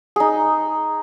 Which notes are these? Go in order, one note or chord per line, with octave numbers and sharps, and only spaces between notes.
D#4 G#4